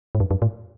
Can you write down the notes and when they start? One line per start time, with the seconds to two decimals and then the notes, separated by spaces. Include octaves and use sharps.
0.15 G#2
0.20 F#2
0.31 F#2
0.42 A2